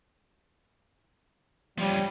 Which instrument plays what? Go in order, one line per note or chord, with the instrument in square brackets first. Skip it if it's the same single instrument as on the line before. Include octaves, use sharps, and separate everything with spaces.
[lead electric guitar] F3 C#4 [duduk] G3